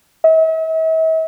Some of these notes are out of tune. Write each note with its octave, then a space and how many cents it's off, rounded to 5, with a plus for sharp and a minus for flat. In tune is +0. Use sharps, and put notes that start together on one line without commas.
E5 -45